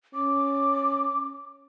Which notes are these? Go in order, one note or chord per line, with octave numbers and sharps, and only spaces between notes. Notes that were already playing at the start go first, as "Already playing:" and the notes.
C#4 D6